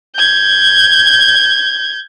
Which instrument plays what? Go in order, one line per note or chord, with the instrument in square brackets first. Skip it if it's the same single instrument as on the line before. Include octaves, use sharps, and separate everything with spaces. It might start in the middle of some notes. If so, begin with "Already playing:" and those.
[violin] G6 G#6